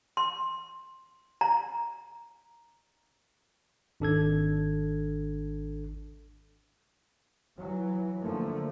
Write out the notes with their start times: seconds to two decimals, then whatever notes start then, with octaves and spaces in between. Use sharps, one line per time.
0.17 C6
1.41 A#5
4.00 G#1 D4 A4 G#6
7.57 E3 F#3
8.22 D3 F3 A3 A#3